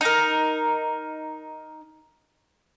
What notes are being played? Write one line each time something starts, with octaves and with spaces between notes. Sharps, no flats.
D#4 A#4